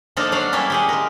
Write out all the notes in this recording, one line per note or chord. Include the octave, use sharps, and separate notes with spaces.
F3 A#3 D4 D#4 A4 A#4
F#3 D4 F5 F#5
G3 A#3 B3 C#4 E4 A4
G4 G#4 F#5
G#3 A#4